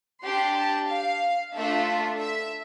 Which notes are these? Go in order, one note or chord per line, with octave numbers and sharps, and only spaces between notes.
D4 G4 C6
A5
F5
A3 D4 F4 A4 E5
E5